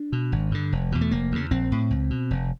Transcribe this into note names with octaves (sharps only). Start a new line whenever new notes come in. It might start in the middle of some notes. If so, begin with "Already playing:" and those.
Already playing: D4
B2
G#1
G2 D3
F1
E2 B2
A3
F1 A#3
E2 C#3
A#1 C4
A2
C#2
B2
F1